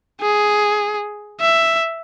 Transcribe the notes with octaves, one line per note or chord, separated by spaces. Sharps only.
G#4
E5